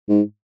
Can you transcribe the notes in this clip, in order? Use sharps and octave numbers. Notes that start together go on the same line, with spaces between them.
G#2